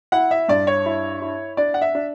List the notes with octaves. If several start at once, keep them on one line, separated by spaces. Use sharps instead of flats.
E4 F#5
E5
G2 D5
C#5
E4
E4
D4 D5
F#5
E5
D4